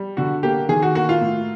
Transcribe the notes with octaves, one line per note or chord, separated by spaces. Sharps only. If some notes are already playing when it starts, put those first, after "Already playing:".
Already playing: G3
D3 F#4
A#3 G4
D#3 G#4
F#4
A#3 F#4
F4
A2